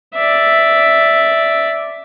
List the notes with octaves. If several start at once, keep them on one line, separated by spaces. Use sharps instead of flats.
D5 E5